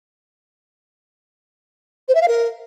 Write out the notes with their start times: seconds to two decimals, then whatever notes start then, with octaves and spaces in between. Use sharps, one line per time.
2.08 C5
2.15 E5
2.21 F5
2.28 A#4